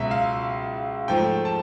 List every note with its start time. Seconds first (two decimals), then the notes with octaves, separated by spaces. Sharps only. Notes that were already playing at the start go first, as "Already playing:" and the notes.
Already playing: C#2 B2 F#3 E5
0.11 F5
1.08 G#2 F3 A3 G5
1.45 A5